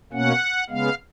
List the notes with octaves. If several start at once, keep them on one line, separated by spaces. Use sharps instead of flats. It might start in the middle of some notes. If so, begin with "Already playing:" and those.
B2 A#3 C#4 F#5
C#3 G#3 B3 F5